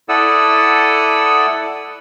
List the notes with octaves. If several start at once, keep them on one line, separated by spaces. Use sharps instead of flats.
E4 A4 D5 F#5 D#6 E6